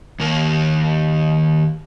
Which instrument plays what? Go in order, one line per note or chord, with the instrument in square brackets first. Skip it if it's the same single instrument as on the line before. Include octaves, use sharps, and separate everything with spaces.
[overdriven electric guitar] D#2 A#3